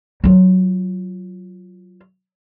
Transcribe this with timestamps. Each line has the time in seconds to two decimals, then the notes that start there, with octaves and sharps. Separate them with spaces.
0.24 F#3 F4